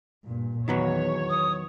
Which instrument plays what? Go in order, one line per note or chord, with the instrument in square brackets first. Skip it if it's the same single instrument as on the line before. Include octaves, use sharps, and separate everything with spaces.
[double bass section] G2 A#2
[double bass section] E2 [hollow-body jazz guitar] D#3 F#3 B3 [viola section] C#5
[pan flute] D#6